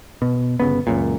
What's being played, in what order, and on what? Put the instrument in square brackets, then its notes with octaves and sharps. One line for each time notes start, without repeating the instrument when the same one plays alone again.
[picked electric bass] B2
G1 C#3 B3
C#2 F#2 A#2